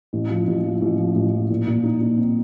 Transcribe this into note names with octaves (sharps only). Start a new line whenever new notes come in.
A1
F3
A1
F3
A1
F3
A1
F3
A#2
A#2
D#4
D#4
C4